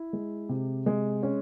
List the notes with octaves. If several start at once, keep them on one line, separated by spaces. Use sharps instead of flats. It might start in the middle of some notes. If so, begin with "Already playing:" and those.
Already playing: E4
G#3
C3
G#3
C#4